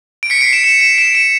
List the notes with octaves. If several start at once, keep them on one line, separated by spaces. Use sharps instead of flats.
D7
B6 C#7
C7 D7
D7 E7
D7 E7
D7 E7
D7 E7
D7 E7